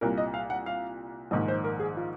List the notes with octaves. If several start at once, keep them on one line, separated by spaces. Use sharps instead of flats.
C2 A#2 A#4
D#5
F5
F#5
F5
A#1 G#2 D#3 D#5
C5
A#4
G#4
F4